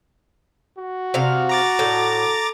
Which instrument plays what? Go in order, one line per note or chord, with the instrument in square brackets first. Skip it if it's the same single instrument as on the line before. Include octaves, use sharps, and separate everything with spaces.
[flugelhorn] F#4
[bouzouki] C3 F5
[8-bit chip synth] A#5 D6 A6
[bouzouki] A2